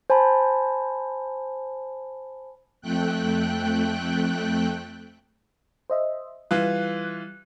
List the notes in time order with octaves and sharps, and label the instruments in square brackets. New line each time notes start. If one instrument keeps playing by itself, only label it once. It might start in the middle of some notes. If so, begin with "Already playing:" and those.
[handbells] C5 G#5 A5 B5
[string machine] F2 A3 G5 F#6
[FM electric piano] C5 D#5 E5
[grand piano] E3 F4 [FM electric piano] G3 F#6